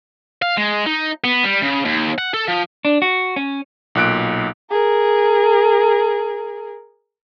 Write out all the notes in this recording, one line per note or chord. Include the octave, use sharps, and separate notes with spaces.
F5
G#3
D#4
B3
G3
C#3
D#2
F#5
A4
F3
D4
F#4
C#4
B1 A#2 F#6 D7
G#4 A#4